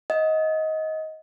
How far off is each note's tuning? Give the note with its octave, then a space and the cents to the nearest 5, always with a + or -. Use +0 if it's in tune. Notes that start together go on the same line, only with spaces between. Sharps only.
D#5 +20 F#5 -30